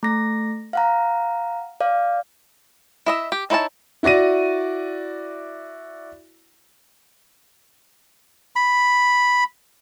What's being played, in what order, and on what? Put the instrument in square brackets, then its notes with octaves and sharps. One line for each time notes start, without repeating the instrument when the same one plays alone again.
[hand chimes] A3 A#6
F5 F#5 A#5
D5 F5
[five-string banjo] E4 D#5 E5
G4
D#4 E4 C5 C#5 A5
[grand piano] E4 F#4 D5 A#6 D#7
[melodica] B5